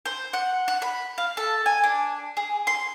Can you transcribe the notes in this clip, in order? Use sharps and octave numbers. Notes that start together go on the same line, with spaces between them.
C5
F#5
F#5
B5
F5
A4
G#5
D4
G#4
C6